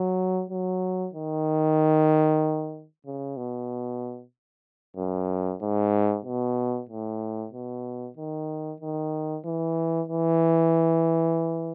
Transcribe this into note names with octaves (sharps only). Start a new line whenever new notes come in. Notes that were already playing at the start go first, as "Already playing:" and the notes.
Already playing: F#3
F#3
D#3
C#3
B2
F#2
G#2
B2
A2
B2
D#3
D#3
E3
E3